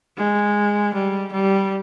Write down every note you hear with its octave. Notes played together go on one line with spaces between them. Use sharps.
G#3
G3
G3